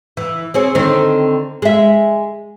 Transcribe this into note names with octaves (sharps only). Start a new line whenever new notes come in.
E3
C4 G#4 C#5
D3 D#3 C4
G#3 E5